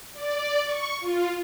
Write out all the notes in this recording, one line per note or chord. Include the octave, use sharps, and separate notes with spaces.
D5
C#6
F4